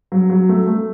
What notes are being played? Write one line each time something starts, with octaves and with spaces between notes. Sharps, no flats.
F#3
F#3
A3
A3